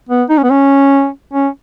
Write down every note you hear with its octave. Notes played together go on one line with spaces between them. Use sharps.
B3
D#4
C#4
B3
C#4
C#4